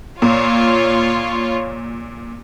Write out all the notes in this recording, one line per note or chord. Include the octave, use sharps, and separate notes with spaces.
A#2 F4 C#5